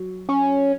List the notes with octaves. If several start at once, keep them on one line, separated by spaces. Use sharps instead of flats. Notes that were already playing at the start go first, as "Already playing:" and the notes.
Already playing: F#3
C#4